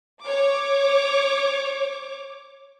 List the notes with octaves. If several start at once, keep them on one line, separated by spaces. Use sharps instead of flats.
C#5 D6